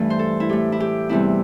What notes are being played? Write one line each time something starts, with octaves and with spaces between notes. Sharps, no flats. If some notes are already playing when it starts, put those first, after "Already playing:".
Already playing: G2 E3 A3
C5
A4
E4
A2 A3 G4
E4
G4
E2 C3 G3 E4